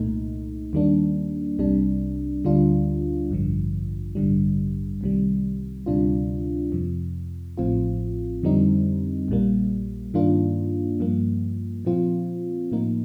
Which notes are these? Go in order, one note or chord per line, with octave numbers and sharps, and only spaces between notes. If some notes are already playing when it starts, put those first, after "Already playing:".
Already playing: C2 A#2 A3 D#4
D#2 D#3 G3 A#3 D4
C2 C3 G3 D4
D2 D3 G3 D4 F4
A1 G2 D3 F3
A1 G2 D3 G3
C2 C3 D#3 G3
D2 C3 G3 D4 F4
F2 C3 F3
A1 A2 F3 C4 F4
F2 D3 G3 C4 D#4
A#1 A#2 G3 A#3
G2 D#3 A#3 D4 F4
G2 F3 A#3
A#2 F3 C4 F4
A2 F3 A#3 D#4